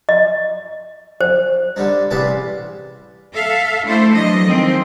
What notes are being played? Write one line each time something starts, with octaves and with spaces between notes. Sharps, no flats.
D#5
C5
D3 G3 D4 D#4
A1 C3 G3 G#4 B4 A5
A4 E5 F5
A3 D4 E4 A4 C5
E3 F#3 D4 D#5
D#3 F3 G#3 C4